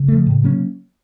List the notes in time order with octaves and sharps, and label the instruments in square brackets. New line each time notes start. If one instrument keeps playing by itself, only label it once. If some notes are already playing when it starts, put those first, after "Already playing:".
Already playing: [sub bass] C#3
[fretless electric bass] F3 A3
A2
F#3 A#3 C#4